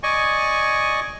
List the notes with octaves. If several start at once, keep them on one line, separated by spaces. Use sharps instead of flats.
D5 D#5 G#5 C#6